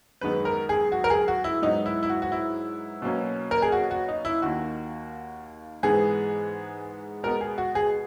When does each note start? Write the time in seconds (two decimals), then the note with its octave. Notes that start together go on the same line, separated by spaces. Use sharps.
0.21 F#2 D#3 G#3 B3 B4
0.45 A#4
0.69 G#4
0.92 F#4
1.04 A#4
1.10 G#4
1.28 F#4
1.44 E4
1.62 G#2 F#3 B3 D#4
1.86 E4
2.03 E4
2.09 F#4
2.22 F#4
2.32 E4
3.02 B2 F#3 A#3 C#4
3.51 A#4
3.62 G#4
3.72 F#4
3.91 F#4
4.08 D#4
4.25 E4
4.42 D#2 D#3 A#3 F#4
5.83 G#2 E3 G#3 B3 G#4
7.23 B2 G#3 B3 A#4
7.41 G#4
7.58 F#4
7.75 G#4